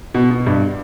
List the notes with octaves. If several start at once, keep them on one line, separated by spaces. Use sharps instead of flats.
B2
B2
G2